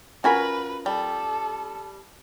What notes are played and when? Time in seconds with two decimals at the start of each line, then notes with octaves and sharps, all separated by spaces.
0.24 C#4 F4 F#4 A#4 B4 G#5 B5
0.86 G3 A4